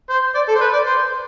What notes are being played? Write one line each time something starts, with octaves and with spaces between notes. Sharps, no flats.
C5
D5
A4
C5
B4
D5
C5